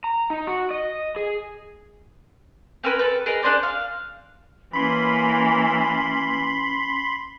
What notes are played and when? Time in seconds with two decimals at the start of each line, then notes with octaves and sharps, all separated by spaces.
0.04 A#5
0.30 D#4
0.47 F#4
0.71 D#5
1.16 G#4
2.84 C4 C#4 A#4 B4
2.99 A4 B4
3.26 G#4 A#4 B4 D#5
3.43 D4 G#4 C5 D5
3.63 F5
4.73 E3 A#3 C#4 B5 C6